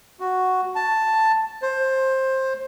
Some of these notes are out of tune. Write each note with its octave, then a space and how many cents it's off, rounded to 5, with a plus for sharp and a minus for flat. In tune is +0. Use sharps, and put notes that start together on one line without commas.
F#4 +0
A5 +5
C5 +15